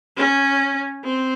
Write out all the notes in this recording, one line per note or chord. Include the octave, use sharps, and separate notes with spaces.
C#4
C4